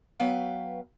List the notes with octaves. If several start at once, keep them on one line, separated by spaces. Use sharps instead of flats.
F#3 B3 B4 F5 G5